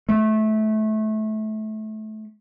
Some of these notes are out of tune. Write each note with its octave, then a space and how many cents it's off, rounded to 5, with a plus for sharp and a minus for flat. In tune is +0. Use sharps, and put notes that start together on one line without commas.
A3 -25